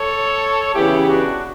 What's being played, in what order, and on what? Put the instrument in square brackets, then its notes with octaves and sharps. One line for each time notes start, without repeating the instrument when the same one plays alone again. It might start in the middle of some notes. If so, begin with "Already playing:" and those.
Already playing: [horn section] A4 C#5
C#3 E3 B3 E4 G4
D4 F#4